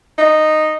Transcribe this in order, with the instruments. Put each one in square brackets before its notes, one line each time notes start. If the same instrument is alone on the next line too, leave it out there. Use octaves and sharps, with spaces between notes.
[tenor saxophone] D#4